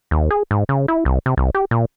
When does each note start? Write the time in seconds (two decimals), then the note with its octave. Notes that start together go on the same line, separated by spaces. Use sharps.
0.11 D#2
0.30 G#4
0.51 G#2
0.69 C#3
0.88 E4
1.05 C2
1.26 C3
1.37 C2
1.55 G4
1.71 A#2